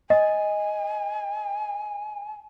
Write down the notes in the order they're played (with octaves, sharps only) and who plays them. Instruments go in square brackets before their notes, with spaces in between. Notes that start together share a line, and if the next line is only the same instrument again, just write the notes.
[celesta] D#5 [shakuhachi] G#5